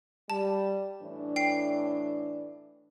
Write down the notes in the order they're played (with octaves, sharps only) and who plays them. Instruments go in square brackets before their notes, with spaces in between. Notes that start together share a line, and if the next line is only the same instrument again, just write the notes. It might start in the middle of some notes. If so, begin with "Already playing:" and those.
[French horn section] G3 [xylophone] A5
[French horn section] A2 E3 D4
[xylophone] G5 C7